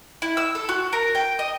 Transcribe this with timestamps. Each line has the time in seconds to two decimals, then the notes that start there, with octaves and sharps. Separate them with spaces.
0.22 E4
0.37 E6
0.55 A4
0.69 F#4
0.93 A#4
1.15 G5
1.39 D#5